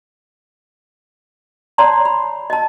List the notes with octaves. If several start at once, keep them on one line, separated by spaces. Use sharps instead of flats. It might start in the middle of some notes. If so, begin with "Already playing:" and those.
C#5 D5 F#5 A5 A#5 C6
B5
D#5 A5